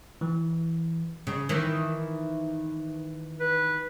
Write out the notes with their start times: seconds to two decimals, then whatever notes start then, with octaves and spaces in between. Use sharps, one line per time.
0.21 E3
1.27 C#3
1.49 D#3 E3
3.40 B4